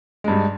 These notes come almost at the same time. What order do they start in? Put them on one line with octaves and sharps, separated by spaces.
G#3 G2 G3